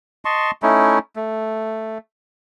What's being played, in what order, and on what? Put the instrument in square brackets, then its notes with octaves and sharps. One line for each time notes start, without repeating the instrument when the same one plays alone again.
[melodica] D#5 A5 C6 C#6
A3 C#4 D#4 E4
A3